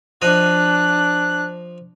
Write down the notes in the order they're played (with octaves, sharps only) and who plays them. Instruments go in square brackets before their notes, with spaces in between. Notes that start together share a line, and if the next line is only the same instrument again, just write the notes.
[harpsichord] F3 D#5 [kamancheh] D4 F#6